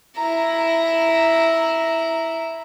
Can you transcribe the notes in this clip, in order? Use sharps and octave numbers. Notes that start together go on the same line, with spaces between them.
E4 A#5